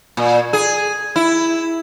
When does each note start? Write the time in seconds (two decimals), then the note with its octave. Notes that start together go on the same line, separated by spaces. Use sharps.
0.17 A#2
0.53 G#4
1.16 E4